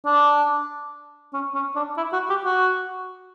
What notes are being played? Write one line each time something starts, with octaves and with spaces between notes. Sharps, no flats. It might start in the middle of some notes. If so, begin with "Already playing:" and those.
D4
C#4
C#4
D4
E4
F#4
G4
F#4